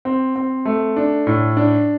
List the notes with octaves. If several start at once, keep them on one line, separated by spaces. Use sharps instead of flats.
C4
C4
A3
D4
A2
D4